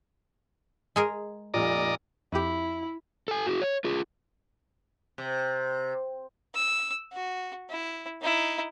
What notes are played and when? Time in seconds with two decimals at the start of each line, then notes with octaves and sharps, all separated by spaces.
0.96 G#3 G#4 A#4
1.54 F1 A#2 D5 D#5 A#5
2.32 F2 E4 G4
3.28 A4 G#5
3.46 F#4 G#4
3.61 C#5
3.84 F4 G#4
5.18 C3
6.54 E6
7.12 F#4
7.70 E4
8.21 D#4 E4